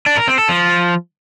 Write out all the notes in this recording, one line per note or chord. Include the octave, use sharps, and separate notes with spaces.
D4
A#4
C4
A4
F3